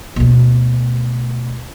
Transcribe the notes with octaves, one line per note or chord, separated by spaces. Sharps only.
D2 B2